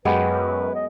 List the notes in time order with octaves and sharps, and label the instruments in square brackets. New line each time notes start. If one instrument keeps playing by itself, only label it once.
[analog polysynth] F#2 [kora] G#3 B3 G4 [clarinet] B4
[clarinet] D#5